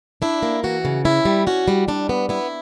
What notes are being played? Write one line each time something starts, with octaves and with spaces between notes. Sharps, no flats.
D4 E4
A#3
E3 F#4
C#3
C#4 E4
G3
C#4 F#4
G3
G3 D4
B3
B3 E4